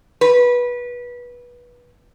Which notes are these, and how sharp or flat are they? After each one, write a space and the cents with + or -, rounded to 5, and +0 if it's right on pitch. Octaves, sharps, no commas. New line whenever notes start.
B4 -20